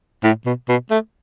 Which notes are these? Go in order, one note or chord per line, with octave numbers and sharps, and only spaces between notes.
A2
B2
B2
A3